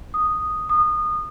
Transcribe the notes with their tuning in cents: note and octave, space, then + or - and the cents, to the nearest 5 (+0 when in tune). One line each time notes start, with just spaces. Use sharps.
D#6 -5
D#6 -25